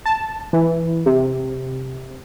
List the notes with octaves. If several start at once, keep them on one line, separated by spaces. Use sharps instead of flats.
A5
E3
C3